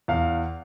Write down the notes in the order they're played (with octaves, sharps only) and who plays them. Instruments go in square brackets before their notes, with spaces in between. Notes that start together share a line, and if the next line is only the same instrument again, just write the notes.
[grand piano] E2 F5